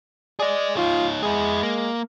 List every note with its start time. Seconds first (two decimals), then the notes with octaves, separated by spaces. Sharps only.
0.39 G#4 D5 D#5
0.77 D#4 F4 C#5
1.23 G#3 E4 G#4
1.63 A#3